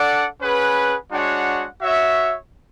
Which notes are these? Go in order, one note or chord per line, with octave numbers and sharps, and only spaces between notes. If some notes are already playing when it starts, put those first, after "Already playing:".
Already playing: D4 A4 D5 F#5
C#4 G#4 B4 F#5
G#3 D4 F#4 C#5 F#5
F#4 C#5 E5